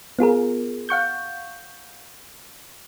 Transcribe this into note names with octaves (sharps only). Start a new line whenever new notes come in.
B3 F4 G#4 A#4
F5 F#5 C#6 G6